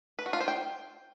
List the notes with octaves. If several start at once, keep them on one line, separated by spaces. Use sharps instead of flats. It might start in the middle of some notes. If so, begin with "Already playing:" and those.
B4
F#4
F4
C5
G5